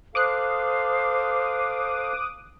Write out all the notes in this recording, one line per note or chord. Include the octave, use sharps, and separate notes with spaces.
A4 C5 F5 D6 D#6 F#6